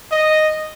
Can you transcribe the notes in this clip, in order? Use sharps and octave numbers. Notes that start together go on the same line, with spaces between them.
D#5